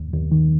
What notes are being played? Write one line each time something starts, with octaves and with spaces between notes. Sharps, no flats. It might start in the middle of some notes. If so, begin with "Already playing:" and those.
Already playing: D#2
D#2
D#3